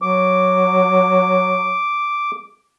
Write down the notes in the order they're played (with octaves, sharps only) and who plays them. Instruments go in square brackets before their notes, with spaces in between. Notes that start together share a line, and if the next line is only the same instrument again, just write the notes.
[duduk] F#3 [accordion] D6